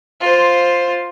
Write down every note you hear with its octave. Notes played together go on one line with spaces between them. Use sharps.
F4 C5